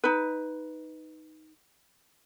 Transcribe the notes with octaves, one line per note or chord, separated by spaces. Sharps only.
D#4 B4